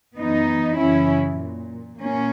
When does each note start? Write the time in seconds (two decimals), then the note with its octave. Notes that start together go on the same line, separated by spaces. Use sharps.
0.17 F#2 E3 B3 D#4
0.78 F#2 C#3 E3 C#4 E4
1.39 A#2
2.00 A#2 A#3 C#4